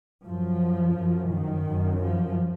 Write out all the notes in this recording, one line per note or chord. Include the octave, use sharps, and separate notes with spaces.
F#2 F3
F#2
D#3
F#2
F3